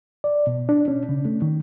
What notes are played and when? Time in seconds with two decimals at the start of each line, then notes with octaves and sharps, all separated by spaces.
0.24 D5
0.47 B2
0.69 D4
0.88 C#4
1.09 C#3
1.25 A3
1.42 D#3